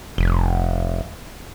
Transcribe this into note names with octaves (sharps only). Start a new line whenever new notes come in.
F1